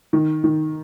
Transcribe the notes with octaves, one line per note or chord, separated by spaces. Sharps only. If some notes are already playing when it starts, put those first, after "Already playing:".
D#3
D#3